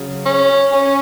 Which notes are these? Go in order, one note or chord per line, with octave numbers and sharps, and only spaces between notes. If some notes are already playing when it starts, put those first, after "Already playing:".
Already playing: C#3 F#3
C#4
C#4